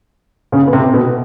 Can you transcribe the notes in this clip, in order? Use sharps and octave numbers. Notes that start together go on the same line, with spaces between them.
C#3 C#4
B3
C3 C4
B2 B3